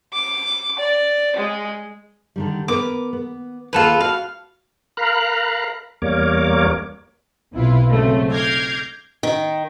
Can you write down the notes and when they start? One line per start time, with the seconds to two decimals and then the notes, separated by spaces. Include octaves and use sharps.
0.13 D6
0.79 D5
1.36 G#3
2.36 D3 D#3 G3
2.68 B3 A#4 B4 D6
3.13 B3
3.73 D#2 A#3 F4 G#4 A4 B4
4.00 F#4 F5
4.97 A#4 F5 A#5 B5 F#6
6.02 E2 G3 A#3 A#4 C#5 D6
7.52 B1 C3 E4 F4 B4
7.90 G#2 C#3 F#3 A3 C4
8.32 D6 F6 G6 G#6 A#6 C7
9.23 D#3